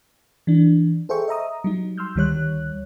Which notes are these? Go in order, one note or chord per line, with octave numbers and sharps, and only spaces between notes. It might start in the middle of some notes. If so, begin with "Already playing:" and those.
E3 D4
G#4 A4 C5 E5 G5 C#6
D#5 E5 A#5 D#6
F#3 G3 D#4
C6 E6 F6 G6
D2 D#3 G3 C#5 F#6